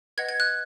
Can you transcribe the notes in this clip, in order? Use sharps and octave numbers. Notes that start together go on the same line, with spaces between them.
B4 D#5 F#5 G#6
G#6
F#6